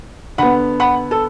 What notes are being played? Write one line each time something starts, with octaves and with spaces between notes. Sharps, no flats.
D3 B3 F#5 B5
F#5 B5
A4